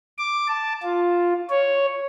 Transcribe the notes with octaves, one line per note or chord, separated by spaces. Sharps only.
D6
A5
F4
C#5